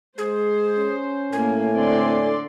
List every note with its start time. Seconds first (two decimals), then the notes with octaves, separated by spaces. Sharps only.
0.18 G#3 G#4 C5
0.78 C#4
1.33 A2 A#3 G#5
1.75 D3 C4 D5 C6